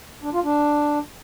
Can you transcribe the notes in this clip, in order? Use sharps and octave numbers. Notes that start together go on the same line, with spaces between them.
D4
F4
D4